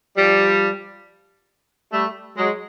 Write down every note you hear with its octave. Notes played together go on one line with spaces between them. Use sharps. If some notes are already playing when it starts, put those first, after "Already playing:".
F3 G3
G3 A3
F#3 G#3